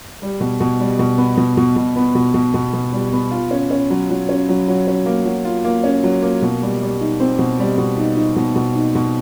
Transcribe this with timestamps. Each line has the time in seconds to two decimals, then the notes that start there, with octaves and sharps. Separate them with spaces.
0.22 G3
0.41 B2
0.60 B2
0.80 G3
0.99 B2
1.18 B3
1.37 B2
1.57 B2
1.76 B2
1.96 B3
2.15 B2
2.34 B2
2.54 B2
2.74 B2
2.92 G3
3.13 B3
3.31 F4
3.51 C#4
3.71 C#4
3.90 F#3
4.10 F#3
4.29 C#4
4.49 F#3
4.68 F#3
4.87 C#4
5.06 A#3
5.26 F#3
5.45 F4
5.64 A#3
5.84 C#4
6.04 F#3
6.22 A#3
6.42 B2
6.62 G3
6.82 G3
7.01 D#4
7.20 C4
7.39 B2
7.59 G3
7.78 B2
7.97 D#4
8.17 D#4
8.36 B2
8.56 B2
8.75 D#4
8.95 B2